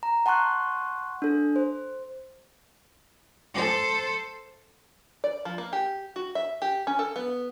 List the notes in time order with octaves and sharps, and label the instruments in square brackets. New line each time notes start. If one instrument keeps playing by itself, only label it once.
[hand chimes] A#5
F#5 A5 C6 C#6 F#6
D4 A4
C5
[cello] A4 C5
[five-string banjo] D5
F3
A#3
G4
F#4
E5
G4
C#4
A4
B3